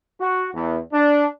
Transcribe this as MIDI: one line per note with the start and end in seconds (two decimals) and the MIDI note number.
0.19 0.48 66
0.54 0.78 40
0.93 1.25 62